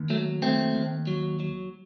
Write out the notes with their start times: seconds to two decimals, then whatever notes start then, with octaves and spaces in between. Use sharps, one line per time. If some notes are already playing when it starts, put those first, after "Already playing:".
Already playing: D#2
0.10 F#3 A3
0.42 D#2 A3 C4
0.75 D#2
1.07 F#3
1.40 F#3